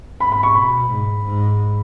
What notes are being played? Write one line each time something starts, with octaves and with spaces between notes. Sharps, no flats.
G#2 B5
B5
C#6
B2 B5
G#2
G#2